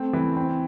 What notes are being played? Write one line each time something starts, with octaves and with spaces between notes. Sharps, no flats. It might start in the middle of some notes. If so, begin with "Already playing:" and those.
Already playing: A3 C4
E3
C4